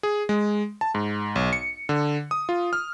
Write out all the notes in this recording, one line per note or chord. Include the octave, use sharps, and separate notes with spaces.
G#4
G#3
A5
G#2
B1
C#7
D3
D#6
F4
F6